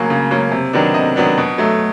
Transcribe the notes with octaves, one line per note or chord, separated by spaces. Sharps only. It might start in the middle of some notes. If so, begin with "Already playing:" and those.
Already playing: C#3 F#3 A#3 C#4
C#3
F#3 A#3 C#4
C3
D#3 F#3 B3 D4
C3 D#5
D#3 F#3 B3 D4
B2
F#3 A3